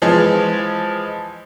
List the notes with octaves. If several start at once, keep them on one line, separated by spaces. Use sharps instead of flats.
E3 F3 G#3